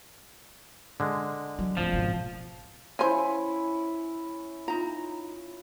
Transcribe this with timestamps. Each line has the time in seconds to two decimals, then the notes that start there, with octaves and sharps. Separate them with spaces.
1.00 D3 G#3
1.59 F#3
1.77 D1 F3
1.93 G#1 B2
2.99 F3 C#4 E4 C5 G#5
4.68 D#4 F4 A#5